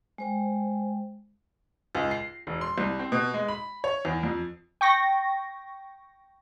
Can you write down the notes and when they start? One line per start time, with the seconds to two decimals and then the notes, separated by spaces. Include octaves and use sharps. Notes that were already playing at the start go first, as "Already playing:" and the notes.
0.18 G#3 C5 G5
1.95 C#2
2.11 C7
2.47 E1
2.61 C6
2.78 C2
2.99 C4
3.12 B2
3.34 G#3
3.48 B5
3.84 C#5
4.05 E2
4.23 F2
4.81 G5 C#6 A#6